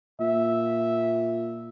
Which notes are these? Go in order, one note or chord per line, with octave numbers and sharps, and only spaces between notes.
A#2 E5